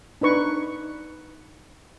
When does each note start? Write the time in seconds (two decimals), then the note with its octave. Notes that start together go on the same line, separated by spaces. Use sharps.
0.21 D4 D#4 B4 C#6